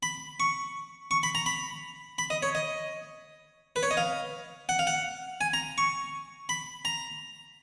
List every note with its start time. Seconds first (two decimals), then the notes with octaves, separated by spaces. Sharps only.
0.03 B5
0.40 C#6
1.11 C#6
1.23 B5
1.35 A#5
1.46 B5
2.18 B5
2.30 D#5
2.42 C#5
2.55 D#5
3.76 B4
3.83 C#5
3.91 D#5
3.97 F5
4.69 F#5
4.79 F5
4.87 F#5
5.41 G#5
5.53 A#5
5.78 C#6
6.49 B5
6.85 A#5